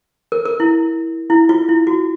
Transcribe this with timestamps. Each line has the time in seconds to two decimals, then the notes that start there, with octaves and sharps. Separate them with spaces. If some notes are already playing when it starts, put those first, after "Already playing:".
0.32 A#4
0.45 A#4
0.60 E4
1.30 E4
1.49 F4
1.69 E4
1.87 F#4